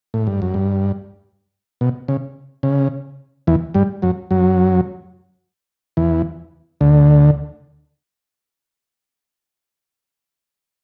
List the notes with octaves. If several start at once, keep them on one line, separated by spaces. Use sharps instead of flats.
A2
G2
F#2
G2
B2
C#3
C#3
E2 E3
G2 G3
F#2 F#3
F#2 F#3
E2 E3
D2 D3